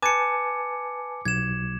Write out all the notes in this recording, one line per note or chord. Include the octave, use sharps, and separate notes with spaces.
B4 G#5 A5 D6 C#7
B1 G#6 E7